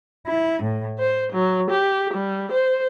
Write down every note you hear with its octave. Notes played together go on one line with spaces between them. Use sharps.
E4
A2
C5
F#3
G4
G3
C5